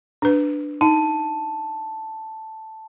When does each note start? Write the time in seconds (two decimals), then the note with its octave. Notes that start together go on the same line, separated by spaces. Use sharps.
0.22 D4 B4
0.81 D#4 A5